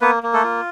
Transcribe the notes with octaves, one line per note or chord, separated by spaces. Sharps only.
A#3 B3 B4
A#3
A3 A4
F4